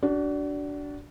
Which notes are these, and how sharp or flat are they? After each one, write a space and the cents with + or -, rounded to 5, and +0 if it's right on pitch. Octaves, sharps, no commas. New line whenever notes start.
D4 -15 F#4 +30